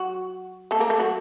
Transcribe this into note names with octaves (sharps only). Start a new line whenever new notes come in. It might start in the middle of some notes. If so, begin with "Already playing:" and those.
Already playing: F#3 F#4
A3 A4
A#3 A#4
A3 A4
F#3 F#4